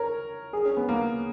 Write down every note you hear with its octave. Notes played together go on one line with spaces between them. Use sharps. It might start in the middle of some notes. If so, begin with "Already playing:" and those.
Already playing: A#4 C#5
G#4
C#4
B3
A#3